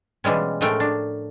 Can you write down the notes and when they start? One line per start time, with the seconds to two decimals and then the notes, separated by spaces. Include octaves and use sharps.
0.24 B2 E3 G3 G#3 C#4
0.61 A2 F3 G#3 A3 A#4 G5
0.80 D4